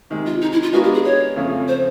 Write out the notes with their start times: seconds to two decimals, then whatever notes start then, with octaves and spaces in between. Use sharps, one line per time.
0.10 C3 D#3 G#3
0.26 F4
0.42 D#4
0.52 E4
0.63 F4
0.73 G#3 B3 D4 F4 F#4 A#4
0.84 G4
0.94 G#4
1.05 C#5
1.36 F2 C#3 F3 A3
1.68 C5